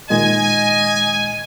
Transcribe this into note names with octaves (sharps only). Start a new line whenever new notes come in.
A#2 D#3 G#3 D#5 G#5